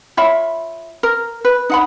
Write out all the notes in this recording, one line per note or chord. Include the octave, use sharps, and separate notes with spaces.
F4 C#5 E5 B5
A#4
B4
D#4 F#5 B5